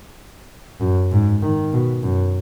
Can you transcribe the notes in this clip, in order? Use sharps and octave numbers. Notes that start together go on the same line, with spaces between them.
F#2
G#2
D#3
B2
F#2